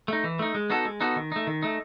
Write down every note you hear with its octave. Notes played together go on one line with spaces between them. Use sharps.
A3 D#4
E3
A3 D#4
G#3
B3 D#4 F#4 A4
G#3
B3 D#4 F#4 A4
D#3
A3 D#4
D#3
A3 D#4